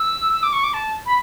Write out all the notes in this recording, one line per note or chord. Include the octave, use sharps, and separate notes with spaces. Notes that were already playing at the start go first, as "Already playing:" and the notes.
Already playing: E6
E6
D6
C#6
D6
A5
B5